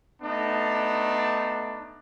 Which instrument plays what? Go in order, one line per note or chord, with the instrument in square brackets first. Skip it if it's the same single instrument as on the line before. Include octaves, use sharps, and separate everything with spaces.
[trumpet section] A3 B3 D4 D#4